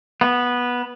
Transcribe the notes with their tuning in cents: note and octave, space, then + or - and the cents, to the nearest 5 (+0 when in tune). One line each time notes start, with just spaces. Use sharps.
B3 -10